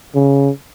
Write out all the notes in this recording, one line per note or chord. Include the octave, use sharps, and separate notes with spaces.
C#3